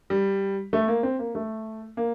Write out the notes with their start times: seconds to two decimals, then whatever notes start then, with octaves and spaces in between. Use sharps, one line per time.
0.10 G3
0.73 A3
0.88 A#3
1.03 C4
1.19 A#3
1.35 A3
1.97 A#3